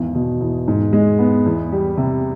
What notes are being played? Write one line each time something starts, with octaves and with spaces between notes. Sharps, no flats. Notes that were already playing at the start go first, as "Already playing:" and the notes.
Already playing: G#1 E2
B2
E2
G#2
G#3
B3
E2
G3
C3